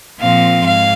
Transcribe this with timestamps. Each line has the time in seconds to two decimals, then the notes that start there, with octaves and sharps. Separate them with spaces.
0.20 A#2 F3 C4 F5
0.65 G#2 F5